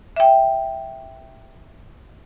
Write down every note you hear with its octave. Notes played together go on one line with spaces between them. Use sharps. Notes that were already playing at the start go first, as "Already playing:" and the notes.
E5 G5